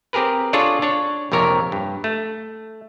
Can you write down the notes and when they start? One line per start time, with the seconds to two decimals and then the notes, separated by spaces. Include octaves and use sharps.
0.13 C4 G4 G#4 A#4 B4
0.53 D4 F4 G#4 A4 C#5 D5
0.82 D4 C#5
1.32 A#1 F2 C3 A#4 C#5
1.72 G2
2.04 A3